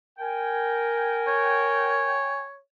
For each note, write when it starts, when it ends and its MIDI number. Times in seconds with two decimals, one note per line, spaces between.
0.19 2.21 70
0.19 2.43 79
0.19 2.43 80
1.28 2.59 73